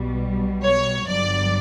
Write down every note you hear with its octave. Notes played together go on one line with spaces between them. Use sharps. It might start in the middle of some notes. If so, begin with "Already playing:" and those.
Already playing: B1 B2 G3
C#5
G1 G2 F#3 D5